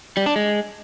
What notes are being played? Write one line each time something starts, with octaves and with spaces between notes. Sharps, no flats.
G3
D4
G#3